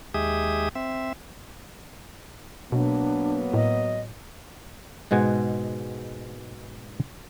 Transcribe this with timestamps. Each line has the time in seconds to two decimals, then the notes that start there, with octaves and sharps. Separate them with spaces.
0.14 D#2 G#3 G4 G#4 E5 D#6
0.75 C4 E5
2.72 B2 F#3 A#3 B3 D4
3.54 A2 D#5
5.11 G#2 B2 G#3 F#5 G#5